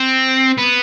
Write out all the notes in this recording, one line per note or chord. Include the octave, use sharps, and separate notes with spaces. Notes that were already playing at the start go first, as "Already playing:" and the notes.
Already playing: C4
B3